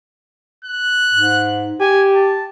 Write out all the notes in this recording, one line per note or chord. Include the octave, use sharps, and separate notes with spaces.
F#6
G#2
G4 G#5
A5